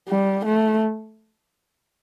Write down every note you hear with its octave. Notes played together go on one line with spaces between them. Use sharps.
G3
A3